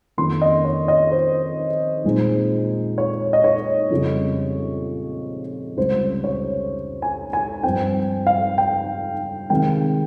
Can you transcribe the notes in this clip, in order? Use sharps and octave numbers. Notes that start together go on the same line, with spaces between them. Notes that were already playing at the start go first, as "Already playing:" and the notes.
F2 D#3 A#3 C#4 C6
D#5
C#5
D#5
C5
A#2 G#3 C4 D#4
C#5
D#5
C#5
F2 C#3 G3
C#2 C3 G3 C#4 C5
C#5
G#5
G#5
G2 F3 C4 G5
F5
G5
C3 D#3 G#3 G5